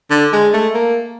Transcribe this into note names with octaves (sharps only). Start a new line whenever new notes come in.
D3
G#3
A3
A#3